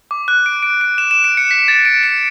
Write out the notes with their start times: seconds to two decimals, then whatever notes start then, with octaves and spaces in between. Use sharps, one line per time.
0.11 D6
0.28 F#6
0.46 D7
0.63 D7
0.81 D7
0.98 E7
1.11 E7
1.24 D7
1.37 C#7
1.51 B6
1.68 A6
1.85 D7
2.03 C#7